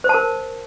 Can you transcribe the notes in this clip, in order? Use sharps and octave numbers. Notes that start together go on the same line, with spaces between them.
C5
A5
A#4